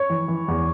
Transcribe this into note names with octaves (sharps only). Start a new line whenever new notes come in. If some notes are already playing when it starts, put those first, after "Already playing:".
Already playing: C#5
E3
E3
E2